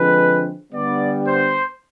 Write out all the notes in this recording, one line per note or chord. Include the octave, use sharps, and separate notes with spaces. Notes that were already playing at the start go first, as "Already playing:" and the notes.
Already playing: D3 F3 G#3 C4 B4
D3 G3 B3 D5
C5